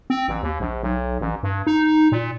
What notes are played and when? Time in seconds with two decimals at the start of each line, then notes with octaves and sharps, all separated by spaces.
0.10 C4
0.28 A1
0.43 D#2
0.60 A#1
0.83 B1
1.21 A1
1.43 G2
1.67 D#4
2.12 A#2